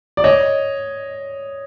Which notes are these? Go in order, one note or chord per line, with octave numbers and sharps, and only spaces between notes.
D5
C#5 D#5